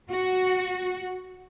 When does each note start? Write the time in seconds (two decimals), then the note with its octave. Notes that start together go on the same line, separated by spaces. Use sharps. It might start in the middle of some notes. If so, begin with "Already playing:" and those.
0.11 F#4